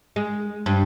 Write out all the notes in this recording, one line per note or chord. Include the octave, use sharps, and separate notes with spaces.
G#3
G2